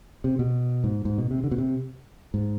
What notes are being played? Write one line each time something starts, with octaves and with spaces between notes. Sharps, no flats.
C3
B2
G#2
G#2
B2
C3
D3
B2
C3
G#2